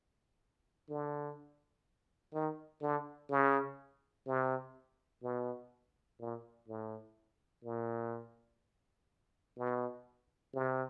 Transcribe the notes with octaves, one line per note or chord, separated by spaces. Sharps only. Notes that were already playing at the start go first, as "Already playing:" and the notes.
D3
D#3
D3
C#3
C3
B2
A#2
A2
A#2
B2
C3